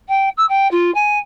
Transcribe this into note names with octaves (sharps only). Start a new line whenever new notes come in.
G5
E6
G5
F4
G#5